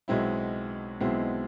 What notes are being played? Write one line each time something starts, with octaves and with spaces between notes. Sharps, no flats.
B1 B2 G#3 C4 E4
B1 B2 G#3 C4 E4